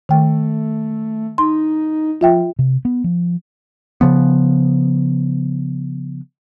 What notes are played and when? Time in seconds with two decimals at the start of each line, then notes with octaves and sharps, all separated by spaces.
0.09 D#3 A3 G5
1.38 D#4 C6
2.21 F3 F4 E5 G5
2.59 C3
2.85 B3
3.04 F3
4.01 C#3 F3 B3